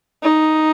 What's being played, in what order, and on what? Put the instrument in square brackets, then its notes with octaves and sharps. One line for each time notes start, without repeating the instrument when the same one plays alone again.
[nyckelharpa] D#4